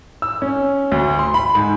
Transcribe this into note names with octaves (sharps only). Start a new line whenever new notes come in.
E6
C#4
D2
C6
B5
G#2